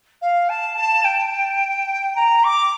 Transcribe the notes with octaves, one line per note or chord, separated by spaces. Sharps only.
F5
A5
A5
G5
A#5
D6